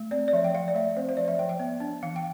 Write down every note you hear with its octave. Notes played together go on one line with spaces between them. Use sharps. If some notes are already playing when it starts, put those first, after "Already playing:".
Already playing: A3
C4 D5
D5
F3 E5
G5
F3 F5
D5
A3 E5
C4 C5
C5
F3 D5
E5
F3 G5
G5
B3
D4
E3 F5
G5